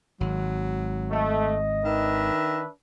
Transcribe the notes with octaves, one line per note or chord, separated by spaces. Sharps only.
G#1 F#3
A3 D#5
D#3 D4 B4 E5